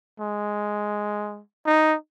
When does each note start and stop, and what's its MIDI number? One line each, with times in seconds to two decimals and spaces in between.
0.20 1.41 56
1.66 1.96 63